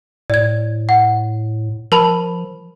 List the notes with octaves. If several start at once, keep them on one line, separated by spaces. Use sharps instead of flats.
A2 D5 G#6
F#5
F3 A#4 A5 B5